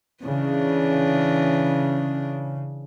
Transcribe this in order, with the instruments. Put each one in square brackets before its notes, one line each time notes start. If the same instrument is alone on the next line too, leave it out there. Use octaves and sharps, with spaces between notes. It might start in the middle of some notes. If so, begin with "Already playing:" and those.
[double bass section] C#3 [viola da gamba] E3 D4